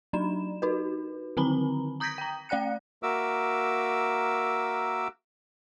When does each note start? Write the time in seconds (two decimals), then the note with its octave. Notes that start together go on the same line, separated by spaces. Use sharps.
0.13 F#3 D4 D#4 E7
0.62 D#4 F#4 B4
1.37 D3 D#3 C4 A#5 B5
2.00 A#5 D#6 G6 G#6 A#6 B6
2.18 G5 A#5
2.49 A3 D5 G5 F#6 C#7
3.03 A#3 F#4 A#4 E5 D6 E6